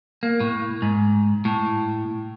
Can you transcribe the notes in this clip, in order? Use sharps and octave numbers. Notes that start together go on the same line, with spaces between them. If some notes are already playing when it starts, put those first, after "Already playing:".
A#3
A2
G#2
A2